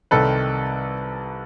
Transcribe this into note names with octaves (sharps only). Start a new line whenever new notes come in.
C2 C3 D#3 A4 B4